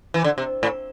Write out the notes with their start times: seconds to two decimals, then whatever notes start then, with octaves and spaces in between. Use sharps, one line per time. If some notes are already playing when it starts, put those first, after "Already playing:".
0.14 E3
0.24 D3
0.38 C3
0.63 A2